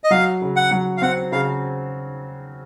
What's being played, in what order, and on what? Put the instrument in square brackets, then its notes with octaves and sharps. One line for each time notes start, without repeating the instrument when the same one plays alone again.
[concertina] D#5
[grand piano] F#3 [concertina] F5
[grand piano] C#3
[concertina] F#5
[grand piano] F#3
[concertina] F5
[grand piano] C4 [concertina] F#5
[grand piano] C#3 [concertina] F5